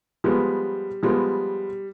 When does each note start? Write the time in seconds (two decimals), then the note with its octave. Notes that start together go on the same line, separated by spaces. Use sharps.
0.24 F3 G3 G#3 B3
1.03 F3 G3 G#3 B3